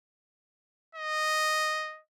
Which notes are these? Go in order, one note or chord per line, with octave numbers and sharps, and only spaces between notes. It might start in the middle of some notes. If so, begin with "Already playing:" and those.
D#5